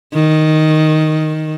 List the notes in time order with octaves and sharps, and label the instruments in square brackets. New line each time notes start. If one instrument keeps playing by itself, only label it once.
[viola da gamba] D#3